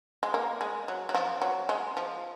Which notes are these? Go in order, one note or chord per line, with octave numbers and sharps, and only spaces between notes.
G#3
A#3
G#3
F#3
F#3
F3
F#3
G#3
F3